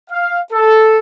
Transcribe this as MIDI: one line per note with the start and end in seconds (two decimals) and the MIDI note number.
0.10 0.40 77
0.53 0.98 69